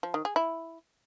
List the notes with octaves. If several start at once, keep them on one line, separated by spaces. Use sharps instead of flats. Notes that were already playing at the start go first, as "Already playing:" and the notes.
F3
D#3
G#4
E4